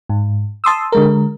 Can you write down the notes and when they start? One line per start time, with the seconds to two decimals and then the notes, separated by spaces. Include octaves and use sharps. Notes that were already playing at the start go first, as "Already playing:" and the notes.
0.09 G#2
0.64 A5 C6 D#6 E6
0.92 D3 G#3 A#4